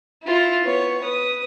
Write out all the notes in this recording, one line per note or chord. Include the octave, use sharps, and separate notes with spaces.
E4 F4
B3 C#5
B4 D#6